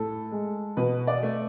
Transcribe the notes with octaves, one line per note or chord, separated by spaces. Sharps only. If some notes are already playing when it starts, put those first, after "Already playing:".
Already playing: A2 A4
G#3
B2 B4
D5
A3